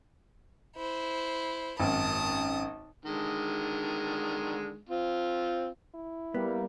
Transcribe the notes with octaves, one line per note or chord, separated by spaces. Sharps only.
E4 C5
G#1 F#2 A5 D#6
D3 D#3 G#3
C4 F4
E4
G3 A#3 B3